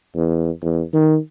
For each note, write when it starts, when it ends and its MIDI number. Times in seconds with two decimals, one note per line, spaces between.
0.15 0.50 40
0.62 0.82 40
0.94 1.16 51